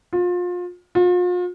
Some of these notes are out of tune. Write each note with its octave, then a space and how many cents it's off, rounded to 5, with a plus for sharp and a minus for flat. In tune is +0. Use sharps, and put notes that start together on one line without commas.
F4 +30
F4 +40